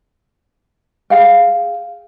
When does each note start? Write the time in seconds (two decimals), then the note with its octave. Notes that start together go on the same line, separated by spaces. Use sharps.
1.10 G#4 F5 G5